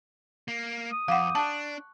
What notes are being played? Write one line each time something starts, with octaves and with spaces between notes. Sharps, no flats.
A#3
D#6
F2 F5 F#5 D6 G6
D4 A5 C#6 F#6